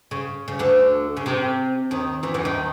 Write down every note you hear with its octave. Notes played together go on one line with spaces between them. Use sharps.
C#3
C#3
D2 D3
C#3
C3
D#2 D#3
E2 E3
E2 E3
D#2 D#3